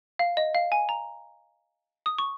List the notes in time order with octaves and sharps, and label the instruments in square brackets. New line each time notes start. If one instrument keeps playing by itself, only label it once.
[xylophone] F5
D#5
F5
G#5
A#5
D#6
C#6